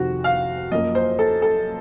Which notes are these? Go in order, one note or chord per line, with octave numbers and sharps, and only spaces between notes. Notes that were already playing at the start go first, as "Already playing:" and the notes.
Already playing: F2 C3 D#3 F#4
F5
F#2 F3 A#3 D#5
C5
A4
A4